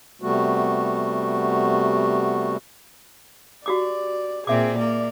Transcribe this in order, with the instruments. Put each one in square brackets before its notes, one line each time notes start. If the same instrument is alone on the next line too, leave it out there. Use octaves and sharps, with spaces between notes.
[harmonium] C3 G3 A3 B3 F#4
[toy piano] F#4 G4 D6 [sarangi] D5
[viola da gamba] A#2 C4 D5 [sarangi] G#4 [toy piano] E5 D6
[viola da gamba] A#3 [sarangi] D5